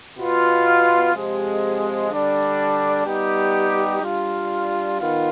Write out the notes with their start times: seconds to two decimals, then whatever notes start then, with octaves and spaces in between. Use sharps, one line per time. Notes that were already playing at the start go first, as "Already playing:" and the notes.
0.18 B2 B3 F4
1.13 C3 F3 G#3 C4 G4
2.09 D3 G3 D4
3.06 G3 B3 D#4 G4
4.02 G3 D4 F4
4.99 D#3 B3 F4